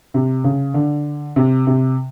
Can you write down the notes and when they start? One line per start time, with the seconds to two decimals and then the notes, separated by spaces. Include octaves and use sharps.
0.14 C3
0.44 C#3
0.74 D3
1.36 C3
1.67 C3